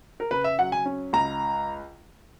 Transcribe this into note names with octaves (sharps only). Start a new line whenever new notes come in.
A#4
C#3 B4
E5
F#3 F#5
G#5
C#4
C#2 A#5